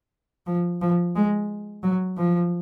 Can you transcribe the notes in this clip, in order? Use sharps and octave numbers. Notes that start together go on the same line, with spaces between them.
F3
F3
G#3
F#3
F3